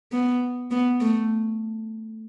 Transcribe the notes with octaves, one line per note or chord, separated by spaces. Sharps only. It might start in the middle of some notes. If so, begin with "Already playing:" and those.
B3
B3
A3